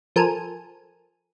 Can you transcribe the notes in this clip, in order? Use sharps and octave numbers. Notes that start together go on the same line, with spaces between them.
F3 A4 A#4 G#5 D#7